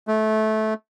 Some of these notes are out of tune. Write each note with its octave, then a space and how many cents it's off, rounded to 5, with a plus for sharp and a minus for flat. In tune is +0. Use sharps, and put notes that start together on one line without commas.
A3 -20